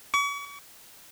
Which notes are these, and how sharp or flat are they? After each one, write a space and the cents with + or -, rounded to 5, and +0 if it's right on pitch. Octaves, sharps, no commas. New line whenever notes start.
C#6 +40